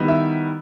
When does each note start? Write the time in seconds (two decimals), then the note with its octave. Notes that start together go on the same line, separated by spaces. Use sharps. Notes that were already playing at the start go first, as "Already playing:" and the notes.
Already playing: D#3 G3 B3 E4
0.08 E5